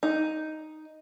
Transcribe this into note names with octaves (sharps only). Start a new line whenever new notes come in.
D#4